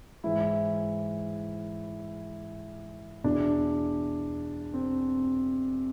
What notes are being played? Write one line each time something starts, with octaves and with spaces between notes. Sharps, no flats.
G#2 E3 E4
E2 B2 D4
C4